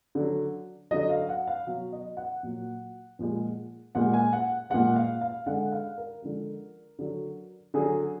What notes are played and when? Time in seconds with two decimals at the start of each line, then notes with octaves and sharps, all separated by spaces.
0.15 D3 F#3
0.91 D3 F#3 D#5
1.10 F5
1.29 F#5
1.47 F5
1.67 B2 F#3
1.92 D#5
2.17 F#5
2.43 A#2 F#3
3.19 A#2 F3 G#3
3.95 A#2 G#3 F#5
4.13 G#5
4.33 F#5
4.70 A#2 G#3 F#5
4.96 F5
5.21 F5
5.46 D3 G#3 F#5
5.72 F5
5.98 A#4
6.22 D3 F3 G#3
6.99 D3 F#3
7.74 D3 F#3 G#4